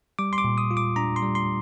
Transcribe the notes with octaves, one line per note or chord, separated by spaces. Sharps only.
G3 D6
C6
D6
A#2
D#6
F4
D6
D4 A#5
C6
G3
C6